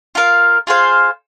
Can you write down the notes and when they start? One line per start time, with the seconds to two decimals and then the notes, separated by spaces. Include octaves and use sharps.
0.15 F4 A#4 F5
0.67 F4 G#4 C5 F5